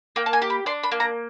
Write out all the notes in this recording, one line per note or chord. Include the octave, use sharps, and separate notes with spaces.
A#3 G5
A5
G#5
G4
B5
D4 C6
B5
A#3
A#5